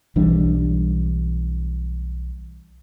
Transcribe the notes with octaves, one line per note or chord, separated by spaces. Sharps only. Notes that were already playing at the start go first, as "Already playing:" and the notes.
B1 E3 G3 D4